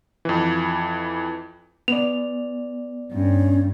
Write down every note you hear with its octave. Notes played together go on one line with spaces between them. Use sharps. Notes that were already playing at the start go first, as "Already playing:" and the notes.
F2 E3
B3 D5 F7
G2 C#4